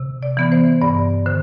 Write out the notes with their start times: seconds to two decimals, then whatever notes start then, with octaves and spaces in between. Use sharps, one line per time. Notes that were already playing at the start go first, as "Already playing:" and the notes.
Already playing: C3
0.23 D5
0.37 E3 B3
0.52 C5
0.81 G2 D5
1.26 D3 C5